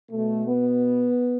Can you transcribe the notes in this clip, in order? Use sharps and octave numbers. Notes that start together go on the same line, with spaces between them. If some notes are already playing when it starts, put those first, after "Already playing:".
B2 A3
B3